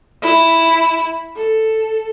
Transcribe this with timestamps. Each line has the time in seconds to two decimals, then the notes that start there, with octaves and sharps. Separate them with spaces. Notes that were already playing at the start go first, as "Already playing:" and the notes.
0.22 E4
1.36 A4